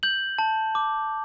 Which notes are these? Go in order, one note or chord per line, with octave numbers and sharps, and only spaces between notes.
G6 F#7
A5
D6